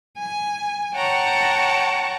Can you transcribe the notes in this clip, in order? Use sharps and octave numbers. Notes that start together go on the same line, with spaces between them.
G#5
C#5 F#5 G5 A5 A#5 C#6